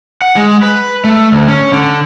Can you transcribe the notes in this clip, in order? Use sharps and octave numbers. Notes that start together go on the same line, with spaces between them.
F#5
G#3
B4
A3
D2
C#4
D3